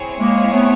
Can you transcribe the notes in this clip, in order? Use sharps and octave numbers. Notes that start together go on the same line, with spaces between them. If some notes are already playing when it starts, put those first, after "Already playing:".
Already playing: C4 E4 G#4 C#5
G#3 A#3
A3 B3